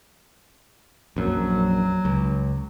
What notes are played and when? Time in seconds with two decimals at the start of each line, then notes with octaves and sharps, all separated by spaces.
1.16 A#1 F#2 F#3
2.05 C#2